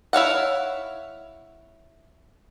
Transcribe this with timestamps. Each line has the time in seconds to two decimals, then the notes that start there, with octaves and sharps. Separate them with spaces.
0.13 E4 C#5 F5 F#5